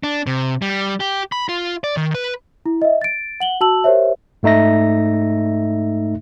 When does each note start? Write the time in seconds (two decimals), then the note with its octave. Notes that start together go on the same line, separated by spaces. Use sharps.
0.03 D4
0.27 C3
0.62 G3
1.00 G4
1.32 B5
1.49 F4
1.84 D5
1.97 D#3
2.14 B4
2.66 E4
2.82 D#5 E5
3.02 A6 D7
3.40 F#5 F#7 G7
3.61 F#4 A5 E6 F#7
3.84 G4 A#4 C5 C#5 E5
4.43 G#2 A3 D#4 E5 A#6